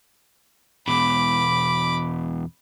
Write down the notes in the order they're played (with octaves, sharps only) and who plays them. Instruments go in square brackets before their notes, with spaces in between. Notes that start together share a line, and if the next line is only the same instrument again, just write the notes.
[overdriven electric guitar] E2 B2 [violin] B5 D6